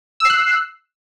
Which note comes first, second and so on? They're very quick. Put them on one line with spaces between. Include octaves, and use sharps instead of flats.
E6 C7 F#6